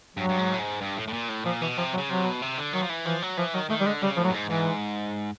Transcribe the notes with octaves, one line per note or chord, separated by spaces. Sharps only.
G2 F#3
G2
G#2
A2
G#2
G2
A2
A2
A#2
A2
A#2 F3
B2 E3
C3 F3
F#3
C#3
C3 F#3
B2
C3
D3
D#3 F#3
F3
E3
E3 F3
F#3
E3 F3
D#3 F#3
D#3 A3
G3
D3 G#3
C#3 G3
A2 F3
F#3
G2
G#2
E3
G#2